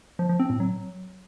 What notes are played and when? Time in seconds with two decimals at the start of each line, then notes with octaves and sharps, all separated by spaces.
0.19 F3
0.29 F3
0.40 C4
0.50 A2
0.60 F#3